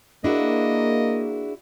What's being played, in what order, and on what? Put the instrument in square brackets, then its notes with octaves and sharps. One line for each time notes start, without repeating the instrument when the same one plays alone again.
[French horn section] A#3 [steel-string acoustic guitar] D4 E4 F#4 [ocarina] G#4 [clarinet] D#5